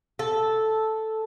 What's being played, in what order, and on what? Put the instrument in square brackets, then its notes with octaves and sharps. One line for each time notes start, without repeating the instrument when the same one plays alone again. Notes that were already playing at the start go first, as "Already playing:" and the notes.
[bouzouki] A4